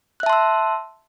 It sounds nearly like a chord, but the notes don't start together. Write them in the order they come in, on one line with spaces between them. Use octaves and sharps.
F#6 E5 A5 C6 E6